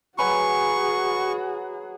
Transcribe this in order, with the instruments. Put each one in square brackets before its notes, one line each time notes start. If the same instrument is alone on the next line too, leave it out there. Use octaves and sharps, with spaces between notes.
[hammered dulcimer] F#3 B4 G#5 [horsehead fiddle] F#4 G#4 [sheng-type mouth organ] C#6